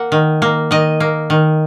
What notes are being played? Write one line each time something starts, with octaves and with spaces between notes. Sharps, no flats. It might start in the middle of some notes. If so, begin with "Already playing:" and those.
Already playing: A#3 F#5
D#3
A#3
D#3 D#5
A#3
D#3